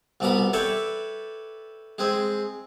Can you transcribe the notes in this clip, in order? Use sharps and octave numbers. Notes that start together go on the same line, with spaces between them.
C2 B2 B3 D5 A#5 B5
A4 B4 C#5 D5 E5 G5
G#3 C4 G#4